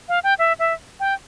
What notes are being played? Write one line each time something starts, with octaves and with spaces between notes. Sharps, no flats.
F5
G5
E5
E5
G5